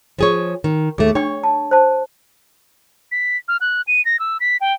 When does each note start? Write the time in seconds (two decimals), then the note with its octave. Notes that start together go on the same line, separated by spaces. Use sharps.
0.18 F3 G#4 C#5
0.64 D#3
0.98 D#2 A3 G#4
1.15 D4 C#5 G5 C#6
1.44 A5
1.71 C5 A5
3.12 B6
3.48 F6
3.61 F#6
3.87 D#7
4.05 A#6
4.19 E6
4.40 B6
4.61 G5